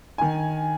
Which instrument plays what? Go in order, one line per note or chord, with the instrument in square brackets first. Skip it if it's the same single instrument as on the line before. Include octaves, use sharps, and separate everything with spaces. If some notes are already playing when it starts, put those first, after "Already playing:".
[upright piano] D#3 G#5